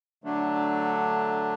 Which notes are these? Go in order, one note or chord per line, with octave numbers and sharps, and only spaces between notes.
D3 F#3 A3 D4